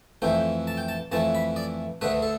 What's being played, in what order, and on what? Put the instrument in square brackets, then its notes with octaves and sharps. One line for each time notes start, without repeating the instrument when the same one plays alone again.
[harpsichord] F2 E3 A3 G5
A5
G5
A5
F2 E3 A3 A5
B5
D5
D2 D3 A3 B4
A4